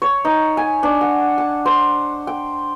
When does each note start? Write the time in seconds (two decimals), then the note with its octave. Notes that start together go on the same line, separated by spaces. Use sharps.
0.02 C#5
0.25 D#4
0.57 G#5
0.83 D4
1.01 F#5
1.38 A5
1.66 C5
2.27 G5